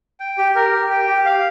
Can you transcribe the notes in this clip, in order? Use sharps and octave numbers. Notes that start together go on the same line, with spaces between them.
G5
G4
A#4
G4
G5
G4
F5